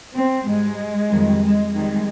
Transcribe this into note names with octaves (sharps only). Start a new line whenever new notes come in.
C4
G#2 G3 G#3
F2 D#3 G3
G#3
F2 D#3 G3 G#3